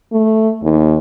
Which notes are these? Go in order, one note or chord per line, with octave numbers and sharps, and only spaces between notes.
A3
D#2